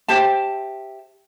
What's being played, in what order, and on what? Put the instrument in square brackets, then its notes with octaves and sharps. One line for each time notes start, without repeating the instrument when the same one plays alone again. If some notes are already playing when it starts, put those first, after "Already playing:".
[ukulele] G4 C5 E5 A5